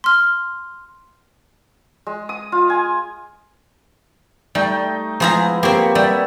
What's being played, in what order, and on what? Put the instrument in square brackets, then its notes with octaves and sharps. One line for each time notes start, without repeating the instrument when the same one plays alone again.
[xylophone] C6 F6
[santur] G#3
D#6
F4
G#5
[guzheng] G3 [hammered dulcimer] A3 D#4 G5
[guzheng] F3 G#4 A#5 [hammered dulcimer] G#3 B3 E4
[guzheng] A#3 C4 [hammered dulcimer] G4 C#5
[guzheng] G3 [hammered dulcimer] E5